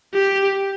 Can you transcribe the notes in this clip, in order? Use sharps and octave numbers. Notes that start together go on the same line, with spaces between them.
G4